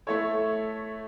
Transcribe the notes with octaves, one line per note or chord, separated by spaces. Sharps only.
A3 E4 A4 C#5